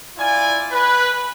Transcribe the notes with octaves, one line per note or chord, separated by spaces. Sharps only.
E4 F4 D5 G#5
B4